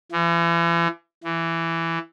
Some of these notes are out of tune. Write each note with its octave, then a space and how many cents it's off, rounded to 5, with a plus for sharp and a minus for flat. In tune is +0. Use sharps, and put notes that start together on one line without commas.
E3 +40
E3 +10